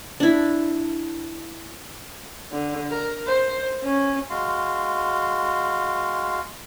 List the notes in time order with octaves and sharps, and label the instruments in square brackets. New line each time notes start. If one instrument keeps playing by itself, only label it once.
[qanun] D4 E4
[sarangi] D3
A#4
C5
C#4
[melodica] G#3 F#4 F5 C6